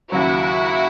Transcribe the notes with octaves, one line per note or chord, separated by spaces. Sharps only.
D#2 C#3 F#3 E4 F#4